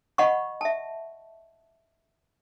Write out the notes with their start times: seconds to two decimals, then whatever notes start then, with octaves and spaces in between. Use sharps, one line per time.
0.18 D#5 F#5 B5 C#6
0.61 E5 A5